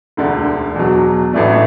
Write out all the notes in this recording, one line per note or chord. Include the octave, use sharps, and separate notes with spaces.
E1 D2 D3
E2 B2 F#3
A1 A2 E3 A3 D4